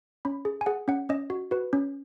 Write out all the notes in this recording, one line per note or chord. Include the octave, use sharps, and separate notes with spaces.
C#4 B5
G#4
G#5
G#4 F#5
C#4 F#5
C#4 D#5
F#4
F#4 B4
C#4